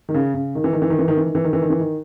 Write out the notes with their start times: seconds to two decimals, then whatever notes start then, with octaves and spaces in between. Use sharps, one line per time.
0.09 D#3
0.14 C#3
0.34 C#3
0.55 D#3
0.64 E3
0.73 D#3
0.82 E3
0.90 D#3
0.99 E3
1.08 D#3
1.17 E3
1.26 D#3
1.35 E3
1.44 D#3
1.53 E3
1.62 D#3
1.70 E3
1.80 D#3